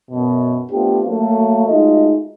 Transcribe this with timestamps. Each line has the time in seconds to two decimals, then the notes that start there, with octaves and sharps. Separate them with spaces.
0.11 F#2 B2
0.71 A3 B3 C4 D4 F4 G4
1.06 F#3 A3 A#3
1.68 G#3 A3 D#4 F4 F#4 D#5